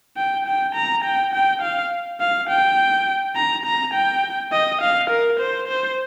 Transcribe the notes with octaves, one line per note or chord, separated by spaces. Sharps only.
G5
G5
A#5
G5
G5
F5
F5
G5
A#5
A#5
G5
D#5
F5
A#4
C5
C5